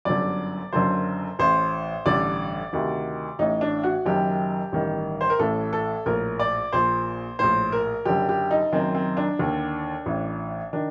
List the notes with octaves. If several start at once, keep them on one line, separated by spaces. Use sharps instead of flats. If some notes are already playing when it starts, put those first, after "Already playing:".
G1 F#2 D3 D5
F#1 F#2 D3 C5
A1 A2 C5
A1 G2 D3 D5
D2 C3 D#3
A1 A2 D#4
D4
F#4
F#1 F#2 D#3 G4
A1 G2 D#3
C5
A#4
A1 A2 A4
A4
A#1 A2 A#4
D5
A#1 A#2 C5
A#1 A2 C5
A#4
F#1 F#2 D3 G4
G4
D#4
F#1 F#2 D#3 C4
C4
D4
D#2 D3
A1 A2
D#3 D4